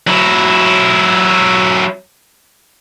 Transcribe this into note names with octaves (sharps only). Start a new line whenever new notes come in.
F#3 E4